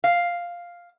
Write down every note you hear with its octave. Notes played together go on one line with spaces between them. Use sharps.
F5